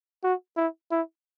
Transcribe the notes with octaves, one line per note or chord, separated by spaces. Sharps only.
F#4
E4
E4